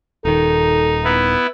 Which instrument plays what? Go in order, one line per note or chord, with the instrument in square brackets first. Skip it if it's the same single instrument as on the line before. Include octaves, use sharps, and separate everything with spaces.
[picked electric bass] D#1 D#3 [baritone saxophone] D#4 [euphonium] A4
[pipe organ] B3 E4